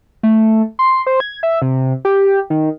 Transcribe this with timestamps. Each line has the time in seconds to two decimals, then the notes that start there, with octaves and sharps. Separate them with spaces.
0.23 A3
0.79 C6
1.07 C5
1.20 G#6
1.43 E5
1.62 C3
2.05 G4
2.50 D#3